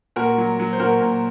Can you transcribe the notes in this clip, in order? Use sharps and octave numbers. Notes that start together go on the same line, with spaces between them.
A#2 F#4 A#4
F#3
F#3
C5
A#2 F#4 A#4
A#2